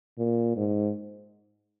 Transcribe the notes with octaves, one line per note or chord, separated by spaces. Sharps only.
A#2
G#2